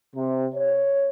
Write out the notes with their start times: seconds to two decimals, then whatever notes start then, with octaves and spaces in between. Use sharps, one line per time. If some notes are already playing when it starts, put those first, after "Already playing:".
0.14 C3
0.55 C#5